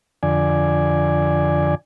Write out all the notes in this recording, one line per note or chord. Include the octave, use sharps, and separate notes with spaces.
F2 D3 D5 G#5